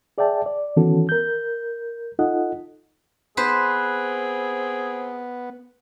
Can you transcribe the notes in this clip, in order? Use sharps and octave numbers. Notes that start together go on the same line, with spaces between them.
G#4 D5 E5 G5 A5
D5
D#3 E3 B3 C#4 F#4 A4
A#4 G6
D#4 F4 A4 D#5 F#5
B3 C4 G#4 B4 C5